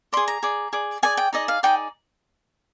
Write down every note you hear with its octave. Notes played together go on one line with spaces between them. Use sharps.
G#4 D5 C6
A#5
G#4 D5
G#4 D5
G#4 D5 G#5
G5
D#4 G#4 D5 D#5
F5
D#4 G#4 D5 G5